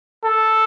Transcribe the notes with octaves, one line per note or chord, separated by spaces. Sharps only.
A4